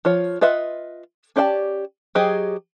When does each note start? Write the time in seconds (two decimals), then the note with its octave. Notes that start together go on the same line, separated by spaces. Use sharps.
0.05 F3 F4 C#5
0.41 F4 B4 D#5 E5 F#5
1.36 C#4 G4 D5 F5 A5
2.15 F#3 G4 G#4 C5 D#5